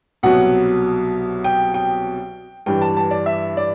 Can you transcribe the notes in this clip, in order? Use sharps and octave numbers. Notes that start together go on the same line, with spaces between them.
C2 B2 F#3 F#5
G5
G5
G2 E3 G3 G5
A5
A5
D5
E5
D5